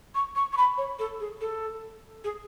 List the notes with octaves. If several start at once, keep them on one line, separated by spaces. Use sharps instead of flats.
C#6
C#6
C#6
B5
C#5
A4
G#4
A4
G#4